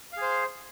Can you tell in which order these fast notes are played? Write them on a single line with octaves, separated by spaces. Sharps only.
F5 G#4 C5